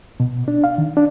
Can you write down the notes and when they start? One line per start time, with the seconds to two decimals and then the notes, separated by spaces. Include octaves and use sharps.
0.20 B2
0.48 D4
0.64 F5
0.78 D#3
0.97 D4